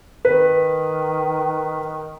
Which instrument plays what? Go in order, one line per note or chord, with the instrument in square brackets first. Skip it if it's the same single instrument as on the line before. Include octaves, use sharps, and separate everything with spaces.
[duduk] D#3 [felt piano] B4